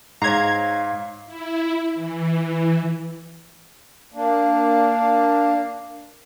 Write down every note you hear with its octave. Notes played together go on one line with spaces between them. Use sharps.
G#2 C#5 F5 A#5 G#6
E4
E3
A#3 D4